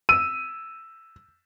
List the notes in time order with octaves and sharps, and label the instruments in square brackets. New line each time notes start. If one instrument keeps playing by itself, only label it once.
[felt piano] E6 [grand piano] D#7